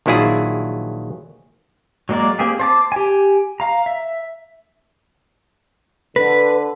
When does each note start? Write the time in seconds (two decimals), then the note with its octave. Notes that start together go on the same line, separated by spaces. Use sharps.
0.06 A#1 D#3 F#3 E4 F4 G#4
2.09 F#3 G#3 A#3 A#4 D5
2.39 A#3 C4 G4 G#4
2.59 C5 A5 D6
2.92 G4 G#5
3.60 F5 A#5
3.86 E5
6.16 D3 B4